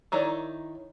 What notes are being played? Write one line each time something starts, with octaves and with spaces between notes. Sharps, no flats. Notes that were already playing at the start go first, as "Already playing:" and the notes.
D#3 D#4 E4 C#5 D5